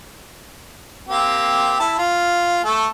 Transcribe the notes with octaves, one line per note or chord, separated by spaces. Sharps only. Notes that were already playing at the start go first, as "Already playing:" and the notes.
A#3 C4 G4
E4 A5
F4
A3 A4 A5